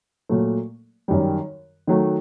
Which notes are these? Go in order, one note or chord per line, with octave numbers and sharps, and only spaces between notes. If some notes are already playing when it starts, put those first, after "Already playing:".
A#2 F#3 A3
F#2 D#3 G3
D#3 F#3 A3